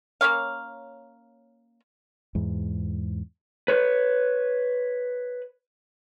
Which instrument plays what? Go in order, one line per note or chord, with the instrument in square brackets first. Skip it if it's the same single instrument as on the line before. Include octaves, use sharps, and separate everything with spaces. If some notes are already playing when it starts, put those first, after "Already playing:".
[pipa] A#3 C#4 C#5 F5
[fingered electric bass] E2 G#2
[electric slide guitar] B4 C#5